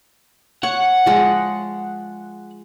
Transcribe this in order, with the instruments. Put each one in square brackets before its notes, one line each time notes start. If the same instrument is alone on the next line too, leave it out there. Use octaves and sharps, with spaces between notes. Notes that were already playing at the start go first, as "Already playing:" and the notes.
[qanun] C#5 [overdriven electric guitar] F#5
[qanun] F3 G#3